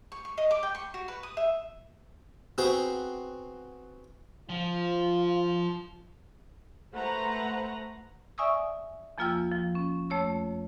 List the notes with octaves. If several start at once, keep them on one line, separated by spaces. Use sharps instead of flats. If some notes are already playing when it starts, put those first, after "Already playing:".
C#6
C#6
D#5
D6
G5
C#6
F#4
B4
D#6
E5
B3 C4 F#4 G#4 C5 G5
F3 F4
A3 B4 C5 F#5 A#5
D5 E5 G#5 C#6 D#6 E6
E2 F3 A#3 F4 G5 E6
F3
C#4
F2 A3 C#5 E6